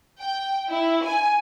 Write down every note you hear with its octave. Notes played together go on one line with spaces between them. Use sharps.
G5
E4
G#5